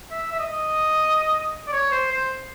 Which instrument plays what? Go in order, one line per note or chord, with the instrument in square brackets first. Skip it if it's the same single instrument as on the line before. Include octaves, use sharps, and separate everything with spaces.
[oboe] E5
E5
D#5
D5
C#5
C5
C5